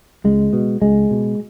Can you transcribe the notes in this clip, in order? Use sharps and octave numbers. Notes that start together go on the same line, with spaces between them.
C#2 G#3
B2
C#2 G#3
B2